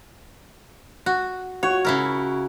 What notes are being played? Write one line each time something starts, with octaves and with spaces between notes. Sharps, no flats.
F#4
F#4 C#5
C#3 E4 A#4